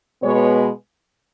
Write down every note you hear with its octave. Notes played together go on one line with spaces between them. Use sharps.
B2 G#3 B3 C#5